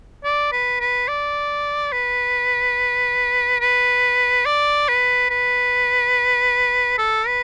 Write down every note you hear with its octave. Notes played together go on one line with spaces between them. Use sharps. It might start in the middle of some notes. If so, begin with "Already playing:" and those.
D5
B4
B4
D5
B4
B4
D5
B4
B4
A4
B4